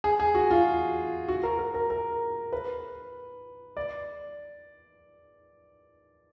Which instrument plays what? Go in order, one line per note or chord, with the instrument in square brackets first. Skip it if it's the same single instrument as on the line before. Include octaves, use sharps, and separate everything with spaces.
[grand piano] G#4
G#4
F#4
F4
F#4
A#4
A#4
A#4
A#4
B4
D5